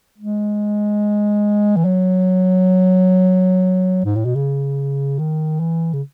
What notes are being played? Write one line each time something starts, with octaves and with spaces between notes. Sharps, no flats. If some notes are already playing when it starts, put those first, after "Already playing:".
G#3
E3
F#3
G#2
A2
B2
C#3
D#3
E3
C#3